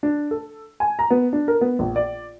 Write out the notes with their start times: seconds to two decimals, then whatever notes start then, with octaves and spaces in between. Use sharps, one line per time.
0.03 D4
0.31 A4
0.80 G#5
0.99 A#5
1.11 B3
1.33 D4
1.48 A#4
1.61 B3
1.79 A#1
1.96 D5